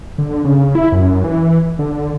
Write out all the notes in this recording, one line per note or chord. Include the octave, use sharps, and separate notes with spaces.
D3
C#3
E4
F#2
E3
D3